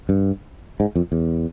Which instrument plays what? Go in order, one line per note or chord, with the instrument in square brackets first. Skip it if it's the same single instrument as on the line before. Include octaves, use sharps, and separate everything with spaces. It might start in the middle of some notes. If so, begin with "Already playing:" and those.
[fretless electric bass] G2
G#2
F2
E2